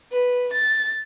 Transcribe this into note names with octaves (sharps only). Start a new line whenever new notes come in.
B4
A6